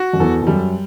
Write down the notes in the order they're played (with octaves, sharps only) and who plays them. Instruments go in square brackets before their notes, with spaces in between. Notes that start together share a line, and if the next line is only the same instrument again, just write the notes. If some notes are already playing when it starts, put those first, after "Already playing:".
Already playing: [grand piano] F#4
[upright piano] F#2
[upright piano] E2 [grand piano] A4
[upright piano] E2
[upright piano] F#2 [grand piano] G3